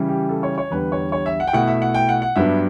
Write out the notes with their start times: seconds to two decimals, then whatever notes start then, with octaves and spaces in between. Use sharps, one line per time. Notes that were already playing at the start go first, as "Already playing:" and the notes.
Already playing: C#3 E3 G3
0.09 G4
0.29 A4
0.43 C#5
0.58 C#5
0.70 E2 D3 G3 B4
0.92 C#5
1.12 C#5
1.26 E5
1.40 F#5
1.47 G5
1.53 B2 A3 E4 F#5
1.68 E5
1.82 F#5
1.94 G5
2.09 F#5
2.22 F#5
2.36 G2 F#3 B3 D4 E5